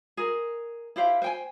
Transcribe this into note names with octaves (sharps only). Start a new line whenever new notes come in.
G#4 A#4
E4 G4 C5 F5
C5 G5 G#5